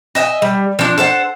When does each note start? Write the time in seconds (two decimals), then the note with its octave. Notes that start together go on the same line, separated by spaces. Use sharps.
0.15 D#5 E5 F#5 G#5
0.42 G3
0.79 F3 D4
0.98 A4 C5 F5 F#5